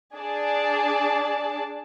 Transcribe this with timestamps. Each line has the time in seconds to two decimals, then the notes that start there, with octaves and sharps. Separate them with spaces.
0.16 D4 G#4 D5 A5